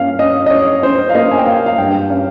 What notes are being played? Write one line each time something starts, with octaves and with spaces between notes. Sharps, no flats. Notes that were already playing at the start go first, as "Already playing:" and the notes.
Already playing: G2 A#3 C#4 F5
C#4 D#5
D#5
C#4 C#5
C#4 C5
F5
A#3 D#5
G#5
G5
A#3 F5
F5
G2 G5
C#4 F5